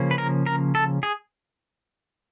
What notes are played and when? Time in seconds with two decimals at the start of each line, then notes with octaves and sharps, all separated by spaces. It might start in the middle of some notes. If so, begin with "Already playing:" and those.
Already playing: C#3 F3 A#3 C#4
0.11 B4
0.18 A#4
0.46 A#4
0.75 A4
1.03 G#4